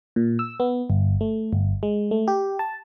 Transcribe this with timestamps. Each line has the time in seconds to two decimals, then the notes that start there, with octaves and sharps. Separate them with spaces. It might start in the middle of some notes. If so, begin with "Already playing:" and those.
0.16 A#2
0.39 E6
0.60 B3
0.90 G1
1.21 A3
1.53 G1
1.83 G#3
2.11 A3
2.28 G4
2.59 A5